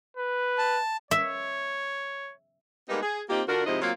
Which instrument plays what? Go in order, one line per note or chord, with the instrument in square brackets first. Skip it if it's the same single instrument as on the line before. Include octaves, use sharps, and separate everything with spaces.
[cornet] B4
[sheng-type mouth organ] A5
[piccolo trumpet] C#5 [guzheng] E5
[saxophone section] G3 G#3 A#3 B3 D#4
G#4
A#3 C4 D#4 F4 G4
D3 D4 F4 F#4 A#4
G#2 C3 F3 E4 C5 D#5
F#3 A#3 C4 F4